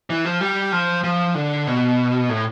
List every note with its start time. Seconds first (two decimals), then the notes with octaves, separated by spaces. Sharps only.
0.10 E3
0.25 F3
0.41 G3
0.72 F3
1.04 F3
1.35 D3
1.67 B2
2.29 A2